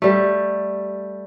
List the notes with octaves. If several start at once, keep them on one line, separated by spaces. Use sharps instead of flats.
G3 A3